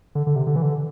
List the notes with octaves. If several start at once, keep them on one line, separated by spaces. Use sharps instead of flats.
D3
D3
C3
D3
E3
D3